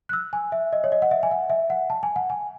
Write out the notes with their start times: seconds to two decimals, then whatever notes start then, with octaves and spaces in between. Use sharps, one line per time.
0.09 F#6
0.13 E6
0.33 G#5
0.52 E5
0.73 D#5
0.84 C#5
0.92 D#5
1.02 F#5
1.11 E5
1.23 G#5
1.31 F#5
1.50 E5
1.70 F#5
1.90 A5
2.03 G#5
2.16 F#5
2.30 G#5